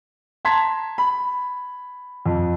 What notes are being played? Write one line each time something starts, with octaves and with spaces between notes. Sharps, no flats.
A5 A#5 C6 G#6 B6
B5
F2